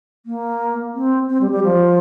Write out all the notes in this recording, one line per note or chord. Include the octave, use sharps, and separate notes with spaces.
A#3
C4
C4
G3
G3
F3